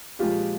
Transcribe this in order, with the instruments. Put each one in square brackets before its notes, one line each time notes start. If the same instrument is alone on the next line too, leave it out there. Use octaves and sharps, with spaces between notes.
[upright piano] A#2 F3 G#3 F4 G4